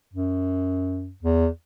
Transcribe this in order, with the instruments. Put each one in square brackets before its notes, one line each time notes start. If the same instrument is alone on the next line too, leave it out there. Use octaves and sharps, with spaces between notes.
[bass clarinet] F#2
E2